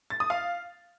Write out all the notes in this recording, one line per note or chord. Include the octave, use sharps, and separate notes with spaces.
A6
D#6
F5